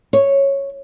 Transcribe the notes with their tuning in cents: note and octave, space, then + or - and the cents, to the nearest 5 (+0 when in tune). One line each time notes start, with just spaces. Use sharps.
C#5 -5